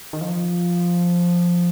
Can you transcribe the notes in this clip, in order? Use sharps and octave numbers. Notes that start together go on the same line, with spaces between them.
D#3
F3